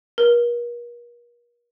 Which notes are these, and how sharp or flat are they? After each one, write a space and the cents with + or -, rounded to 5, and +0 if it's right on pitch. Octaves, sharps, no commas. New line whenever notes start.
A#4 +40